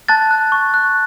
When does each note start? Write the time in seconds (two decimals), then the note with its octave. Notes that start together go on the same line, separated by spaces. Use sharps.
0.08 A5 F#6 A6
0.31 F#6
0.52 C#6
0.74 F#6